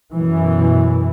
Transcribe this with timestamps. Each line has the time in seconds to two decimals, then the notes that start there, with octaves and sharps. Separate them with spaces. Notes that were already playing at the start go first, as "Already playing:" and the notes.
0.13 F#2 B2 E3